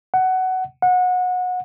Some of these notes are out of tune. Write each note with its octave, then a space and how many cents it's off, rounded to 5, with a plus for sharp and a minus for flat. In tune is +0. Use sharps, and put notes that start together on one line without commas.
F#5 +15
F#5 -25